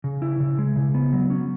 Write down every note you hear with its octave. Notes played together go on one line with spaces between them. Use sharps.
C#3
E4
C#3
G#3
C#3
B3
F#3
C#4